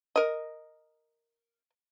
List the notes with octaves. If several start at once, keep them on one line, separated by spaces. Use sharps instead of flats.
A#4 D#5